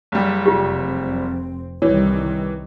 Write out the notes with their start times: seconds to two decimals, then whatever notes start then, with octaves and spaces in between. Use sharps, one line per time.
0.12 F#1 G3
0.46 F1 C4 F4 G4
1.82 C2 D#3 E3 G3 C#5